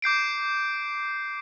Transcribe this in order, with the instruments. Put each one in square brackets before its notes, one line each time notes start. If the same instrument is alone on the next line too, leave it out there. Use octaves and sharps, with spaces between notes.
[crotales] D6 G6 C7 D7